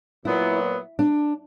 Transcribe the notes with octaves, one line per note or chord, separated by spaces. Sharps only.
A#2 F#3 B3 E4
D4